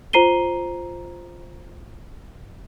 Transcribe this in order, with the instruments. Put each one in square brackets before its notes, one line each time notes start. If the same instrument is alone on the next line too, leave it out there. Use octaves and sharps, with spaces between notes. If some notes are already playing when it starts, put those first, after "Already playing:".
[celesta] F4 C5 A#5 C7 D#7 G7